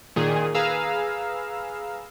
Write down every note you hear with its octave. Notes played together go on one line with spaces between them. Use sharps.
A#2 D#3 G#4
G#4 B4 F5 A#5 E6